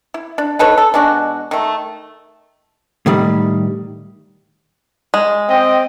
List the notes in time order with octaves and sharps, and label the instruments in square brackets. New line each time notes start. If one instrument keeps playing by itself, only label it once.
[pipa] E4
D4
D#4 A4 B4 C#5
A4
B2 G#3 D4 F#4
D#3 A3
[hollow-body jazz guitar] A2 D#3 G3
[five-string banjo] G#3
[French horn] C4 [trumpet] D#5 [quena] G5